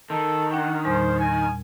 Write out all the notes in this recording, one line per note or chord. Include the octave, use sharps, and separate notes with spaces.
D#3 A4
D4 F#5 G5
E2 A#2 G3 C5
G#5